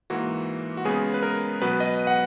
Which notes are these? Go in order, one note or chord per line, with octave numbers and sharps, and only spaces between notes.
G#2 E3 A#3 F#4
F#4
C#3 G#3 B3 G#4
B4
A#4
B2 F#3 B3 B4
D#5
F#5